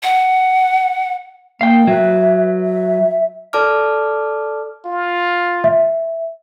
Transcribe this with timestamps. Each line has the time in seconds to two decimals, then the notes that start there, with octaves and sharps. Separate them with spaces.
0.03 F#5
1.61 A#3 F5 G5
1.87 F#3 B4 E5
2.62 E5
3.53 A4 D5 A5 D6 F6
4.85 F4
5.64 E5